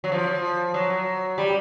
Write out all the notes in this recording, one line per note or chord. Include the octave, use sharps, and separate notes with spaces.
F#3
F3
F#3
G3